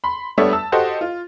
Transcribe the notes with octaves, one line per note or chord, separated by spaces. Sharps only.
B5 C6
G3 A3 B3 D4 C#5 E5
A5 E6
F#4 G4 A4 C5 D#5
F4